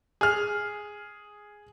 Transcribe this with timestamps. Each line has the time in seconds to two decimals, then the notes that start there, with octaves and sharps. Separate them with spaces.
0.21 G#4 F6